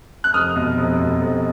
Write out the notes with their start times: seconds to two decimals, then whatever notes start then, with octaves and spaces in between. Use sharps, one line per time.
0.24 F#6
0.34 F1 D#6 F6
0.56 B2
0.78 F1
0.99 B2
1.21 F1